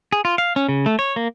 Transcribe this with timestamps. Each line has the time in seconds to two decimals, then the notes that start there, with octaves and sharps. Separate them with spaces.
0.12 G#4
0.25 F4
0.38 F5
0.56 C#4
0.69 C#3
0.86 A3
0.99 C#5
1.16 A#3